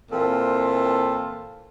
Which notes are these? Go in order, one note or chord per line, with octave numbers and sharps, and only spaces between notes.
A#2 E3 C4 A4